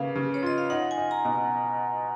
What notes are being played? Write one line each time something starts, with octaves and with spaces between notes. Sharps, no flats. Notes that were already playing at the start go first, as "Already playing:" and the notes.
Already playing: C#3 A#3 B4 F5
C#3
C#5
F4 D#5
F5
D#4 F#5
G#5
D#4
A#5
B2